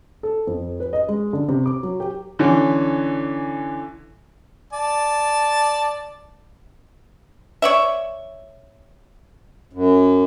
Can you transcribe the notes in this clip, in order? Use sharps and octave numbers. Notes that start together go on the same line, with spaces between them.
A4
F2
B4
D#5
G#3
D3
C3
D6
F#3
G4
D3 E3 C#4
D5 A5
C#5 D5 E5
F#2